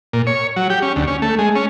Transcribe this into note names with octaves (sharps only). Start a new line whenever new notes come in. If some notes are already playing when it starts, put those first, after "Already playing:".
A#2
C#5
F#3
G4
C#4
D2
C#4
A3
G#3
C#4